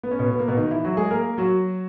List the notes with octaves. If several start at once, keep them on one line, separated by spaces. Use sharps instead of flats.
B3
C#4
B2 B3
B3
A#3
B2 B3
D#3 D#4
E3 E4
F#3 F#4
G#3 G#4
A#3 A#4
F#3 F#4